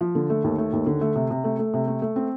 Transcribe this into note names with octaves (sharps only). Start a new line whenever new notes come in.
F3
D3
A3
D#2
A3
D#2
D3
A3
C3
C3
A3
A3
C3
A3
A3
C4